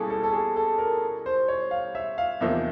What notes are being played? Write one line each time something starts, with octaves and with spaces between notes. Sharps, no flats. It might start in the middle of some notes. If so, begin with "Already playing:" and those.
Already playing: B2 G3 A#3 C#4 E4 G#4 A4
A4
A4
G#4
A4
A#4
C5
C#5
F5
E5
F5
E2 C3 F3 A#3 D#4 E5